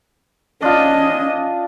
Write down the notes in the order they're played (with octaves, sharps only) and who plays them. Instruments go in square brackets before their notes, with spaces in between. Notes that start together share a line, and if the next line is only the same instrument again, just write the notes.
[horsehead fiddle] C#4 D#5 [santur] D4 F4